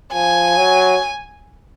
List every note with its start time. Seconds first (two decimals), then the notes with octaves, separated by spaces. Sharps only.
0.13 F3 G#5
0.57 F#3